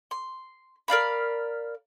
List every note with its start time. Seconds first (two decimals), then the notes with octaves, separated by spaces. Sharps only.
0.11 C6
0.88 A#4 D5 F5 B5